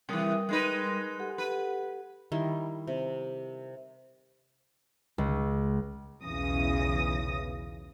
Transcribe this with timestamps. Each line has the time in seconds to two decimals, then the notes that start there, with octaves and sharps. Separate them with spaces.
0.09 C3 E3 G3 A#4 D#6
0.49 G#3 D#4 B4
1.20 G4 A4 F#5
1.38 B4
2.32 D#3 G3 E4 C6
2.87 C3
5.18 C#2
6.25 B1 E2 C#3 E3 D#6 A#6